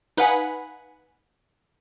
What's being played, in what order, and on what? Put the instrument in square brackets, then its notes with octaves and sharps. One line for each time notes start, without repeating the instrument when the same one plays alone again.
[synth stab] D#4 B4 F5 F#5 G#5 B5